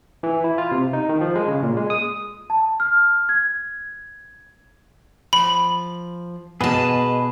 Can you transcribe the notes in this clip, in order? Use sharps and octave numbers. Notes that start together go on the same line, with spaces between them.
E3
E4
F4
C3
D#4
D#3
F3
G#3
C#3
A#2
G#3
D#6
A5
F6
G#6
F3 B5
B2 G#4 B4 D#5 A5